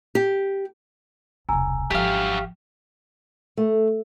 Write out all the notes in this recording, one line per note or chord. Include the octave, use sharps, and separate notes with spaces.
G4
E1 C2 G#5 A#5 E6
G#1 F3 F#3 G4 E5 F5
A3